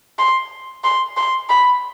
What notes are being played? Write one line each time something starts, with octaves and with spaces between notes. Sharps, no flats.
C6
C6
C6
B5